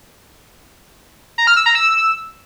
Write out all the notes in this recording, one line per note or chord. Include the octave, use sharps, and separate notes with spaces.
A#5
F6
E6
A#5
E6